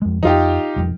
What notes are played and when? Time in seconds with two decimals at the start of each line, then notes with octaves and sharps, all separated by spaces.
0.02 F2 G#3
0.23 F2 F3 D#4 F4 G4
0.76 E1 F2 G3